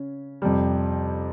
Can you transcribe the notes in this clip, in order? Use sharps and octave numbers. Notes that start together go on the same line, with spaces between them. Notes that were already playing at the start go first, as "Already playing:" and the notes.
Already playing: C#3 C#4
F2 C3 G3